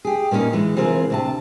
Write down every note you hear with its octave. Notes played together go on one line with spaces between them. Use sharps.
G4 G#4
A#2 A#3 B3 C#4 D#4
E3 G#3
C3 E3 C4 F4 G#4 A#4
D2 C3 A5